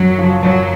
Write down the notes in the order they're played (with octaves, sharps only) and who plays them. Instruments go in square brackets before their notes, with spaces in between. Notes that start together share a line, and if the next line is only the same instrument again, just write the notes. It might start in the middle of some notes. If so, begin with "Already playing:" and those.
Already playing: [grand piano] F#2 [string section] F#3
[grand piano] C#3 F3
[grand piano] F#2 [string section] F#3